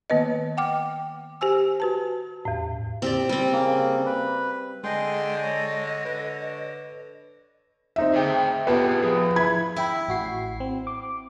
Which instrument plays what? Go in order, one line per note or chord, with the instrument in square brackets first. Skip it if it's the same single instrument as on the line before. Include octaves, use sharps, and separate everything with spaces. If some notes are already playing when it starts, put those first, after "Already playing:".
[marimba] D#3 A#3 B3 B4 D#5
F#5 G5 D6 F6
G4 C5 G#5 E6
F#4 B4 A5
E2 A2
[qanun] C4 G4 D5
G3 C4
[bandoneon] C#3 A#3
B4
[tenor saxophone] D3 [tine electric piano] G#3 [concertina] G#4 G5 C6 [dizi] D#5
[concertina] C#5
[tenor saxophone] D3 [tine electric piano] B4
[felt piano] C4 D#4 E5
[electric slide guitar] G#4 C5 G5
[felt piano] B3 G4 [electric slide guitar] F4 G#4 A5
[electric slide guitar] F3 G#4
[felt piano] E4 B5 G#6
[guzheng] E4 [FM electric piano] E5 G5 B5
[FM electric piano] A1 F#4 C7
C4
D6